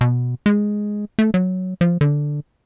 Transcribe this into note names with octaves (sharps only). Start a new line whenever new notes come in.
B2
G#3
A3
F#3
F3
D3